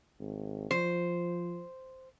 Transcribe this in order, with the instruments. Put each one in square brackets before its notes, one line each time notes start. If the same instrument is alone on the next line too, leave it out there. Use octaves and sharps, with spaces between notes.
[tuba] G#1
[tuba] F3 [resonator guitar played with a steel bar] C5